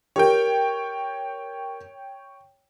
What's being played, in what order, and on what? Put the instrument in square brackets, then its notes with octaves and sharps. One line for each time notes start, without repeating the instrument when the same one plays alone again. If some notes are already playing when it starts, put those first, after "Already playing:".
[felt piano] G4 A#4 [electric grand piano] C#5 G5